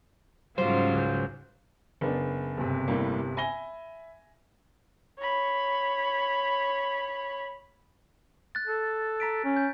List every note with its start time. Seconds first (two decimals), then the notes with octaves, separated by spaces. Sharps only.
0.58 G#2 C#3 F#3 G3 F4 C5
0.94 C#2 F#6 G6
2.01 F#1 B3 D4
2.57 G1 C3
2.88 A2 G3 A#3
3.37 E5 G#5 B5 A#6 G7
5.18 C#5 B5
8.55 F#6 A6
8.67 A4
9.20 A#5 B6 D7
9.44 C#4
9.57 G6